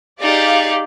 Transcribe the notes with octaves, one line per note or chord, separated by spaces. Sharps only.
D#4 G4 G#4 D5 F5